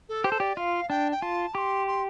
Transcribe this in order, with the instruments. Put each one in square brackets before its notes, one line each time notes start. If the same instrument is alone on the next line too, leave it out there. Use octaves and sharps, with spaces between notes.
[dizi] A4
[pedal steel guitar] G4 [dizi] C5
[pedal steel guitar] A4
[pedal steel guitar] G4 [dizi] D5
[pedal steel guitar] F4 [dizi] F5
[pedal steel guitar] D4 [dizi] G5
[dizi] G5
[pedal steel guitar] F4 [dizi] A5
[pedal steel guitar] G4 [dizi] C6 D6
[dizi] C6